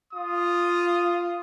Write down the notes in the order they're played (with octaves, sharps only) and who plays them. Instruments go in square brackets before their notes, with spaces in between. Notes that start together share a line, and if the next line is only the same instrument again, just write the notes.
[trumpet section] F4 D#6